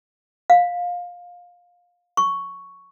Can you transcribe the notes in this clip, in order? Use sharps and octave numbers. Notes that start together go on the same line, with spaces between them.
F5
C#6